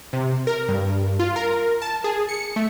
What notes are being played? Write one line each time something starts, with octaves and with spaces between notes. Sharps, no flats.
C3
A#4
G2
F4
A#4
A5
G#4
C#7
A3